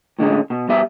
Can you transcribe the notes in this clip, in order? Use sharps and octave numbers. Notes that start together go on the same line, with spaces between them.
A2 D3 G#3 C#4
B2
G2 B3 G4 E5